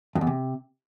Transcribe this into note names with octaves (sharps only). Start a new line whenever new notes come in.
F2
E2
C3